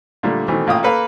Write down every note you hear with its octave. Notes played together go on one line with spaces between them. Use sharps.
A#2 D3 G3 A3
B2 D#3 E3 A3 C4
A1 A#2 F5 G5 D#6
A#3 A4 B4 F5